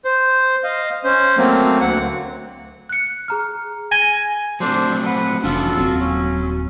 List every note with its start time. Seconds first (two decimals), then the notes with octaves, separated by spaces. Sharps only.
0.05 C5
0.64 D#5 F5
1.04 C#4 C5
1.38 F#3 A3 A#3 C4
1.81 D2 F#5
2.89 F#6 C#7
3.28 G#4 A#5 F6
3.91 G#5 A#6 D#7 G7
4.60 F#3 A3 C4 D4 C5
5.05 B4 F#5
5.44 F1 E3 C#4 D4 F4 F#4 A4
5.77 D#1 F#3 C4
6.00 C#4